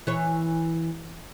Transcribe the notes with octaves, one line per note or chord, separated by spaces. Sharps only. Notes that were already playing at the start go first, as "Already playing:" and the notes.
E3 C#5